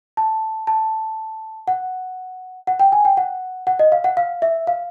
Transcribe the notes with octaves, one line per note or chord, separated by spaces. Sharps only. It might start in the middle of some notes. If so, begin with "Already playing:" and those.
A5
A5
F#5
F#5
G5
G#5
G5
F#5
F#5
D#5
F5
F#5
F5
E5
F5